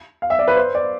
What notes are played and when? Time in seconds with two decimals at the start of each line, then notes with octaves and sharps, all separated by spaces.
0.22 F5
0.30 E5
0.39 D5
0.48 B4
0.56 C5
0.75 D5